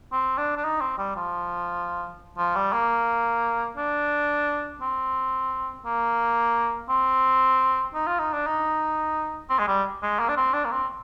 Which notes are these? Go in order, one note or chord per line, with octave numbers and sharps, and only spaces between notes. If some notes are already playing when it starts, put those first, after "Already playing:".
C4
D4
D4
D#4
C4
G3
F3
F3
G3
A#3
D4
C4
A#3
C4
D#4
F4
D#4
D4
D#4
C4
G#3
G3
G#3
A#3
D4
C4
D4
A#3
C4